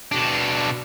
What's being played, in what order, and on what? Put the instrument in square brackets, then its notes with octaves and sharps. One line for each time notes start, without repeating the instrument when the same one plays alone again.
[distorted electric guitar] B2 D4